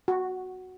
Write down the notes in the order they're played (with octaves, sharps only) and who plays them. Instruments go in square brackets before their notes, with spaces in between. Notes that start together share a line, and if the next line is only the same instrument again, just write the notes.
[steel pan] F#4